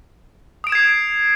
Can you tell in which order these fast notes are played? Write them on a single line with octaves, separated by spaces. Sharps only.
D#6 D7 E7 G#6 C7